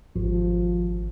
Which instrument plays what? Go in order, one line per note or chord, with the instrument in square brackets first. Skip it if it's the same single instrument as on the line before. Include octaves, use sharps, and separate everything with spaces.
[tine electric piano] G#1 [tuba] F3